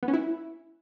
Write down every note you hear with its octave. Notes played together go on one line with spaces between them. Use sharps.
B3
C#4
E4